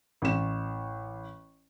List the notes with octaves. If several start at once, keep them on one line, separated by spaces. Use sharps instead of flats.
A1 E7